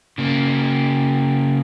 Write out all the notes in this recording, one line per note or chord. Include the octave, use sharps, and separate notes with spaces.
C#3 A#3